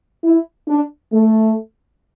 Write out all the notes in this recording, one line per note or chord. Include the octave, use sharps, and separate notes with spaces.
E4
D4
A3